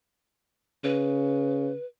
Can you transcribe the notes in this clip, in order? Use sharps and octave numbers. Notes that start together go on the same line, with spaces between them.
C#3 B4